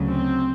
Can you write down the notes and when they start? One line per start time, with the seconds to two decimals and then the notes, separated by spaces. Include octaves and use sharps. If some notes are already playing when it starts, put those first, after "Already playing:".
Already playing: D2 C#3 F#3
0.10 C4